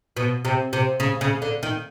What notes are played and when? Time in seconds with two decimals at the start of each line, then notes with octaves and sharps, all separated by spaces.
0.17 B2
0.45 C3
0.73 C3
1.00 C#3
1.21 C#3
1.42 D3
1.63 D#3